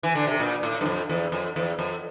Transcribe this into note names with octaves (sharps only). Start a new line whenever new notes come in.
E3
D3
C3
A#2
A2
G2
F2
E2
F2
E2
F2